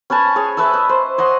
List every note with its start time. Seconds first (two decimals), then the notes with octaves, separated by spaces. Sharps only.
0.10 C#4 B4 G#5 A5
0.36 G#4 C#5
0.57 B4 E5 A5 E6
0.73 D#5
0.89 C5
1.18 C#5 D#5 F#5 C6